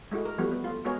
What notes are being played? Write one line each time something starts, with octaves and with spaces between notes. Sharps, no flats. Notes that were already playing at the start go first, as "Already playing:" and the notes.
G#3 A3 E4 F#4
A#4
E3 F3 G3 A3 B3 F#4
B3
A3 F4
G#3 B3 F#4 G#4 A#4 C#5